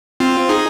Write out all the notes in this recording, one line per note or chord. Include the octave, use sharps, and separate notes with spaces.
C4 F4
D#4 G#4